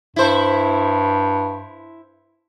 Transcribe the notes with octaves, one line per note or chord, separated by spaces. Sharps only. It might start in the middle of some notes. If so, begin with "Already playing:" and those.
G2 E4 C5